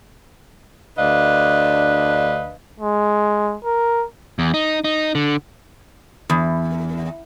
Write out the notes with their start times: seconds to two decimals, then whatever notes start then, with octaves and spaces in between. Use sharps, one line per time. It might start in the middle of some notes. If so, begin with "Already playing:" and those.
0.98 D2 D4 B4 D#5 F5
2.80 G#3
3.65 A#4
4.39 E2
4.54 D#4
4.84 D#4
5.15 D3
6.30 E2